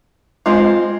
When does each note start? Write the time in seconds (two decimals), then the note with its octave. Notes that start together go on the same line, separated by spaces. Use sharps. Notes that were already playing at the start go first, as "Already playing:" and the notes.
0.46 G#3 C4 F4